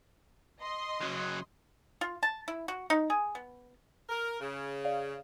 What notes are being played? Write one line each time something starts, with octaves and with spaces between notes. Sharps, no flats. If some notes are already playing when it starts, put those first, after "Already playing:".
D#5 C6
C#3 F#3
F4
A5
E4
F#4
D#4
G#4
B3
A#4
C#3
D5 F5